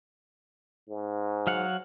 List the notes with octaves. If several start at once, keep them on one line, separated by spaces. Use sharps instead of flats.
G#2
F#3 F5 F#5